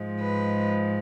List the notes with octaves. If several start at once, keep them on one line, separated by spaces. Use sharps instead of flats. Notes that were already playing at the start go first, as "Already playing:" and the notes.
Already playing: G#2 F3 G#3
B4